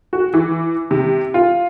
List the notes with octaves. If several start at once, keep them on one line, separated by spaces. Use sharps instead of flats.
F#4
E3
C3
F4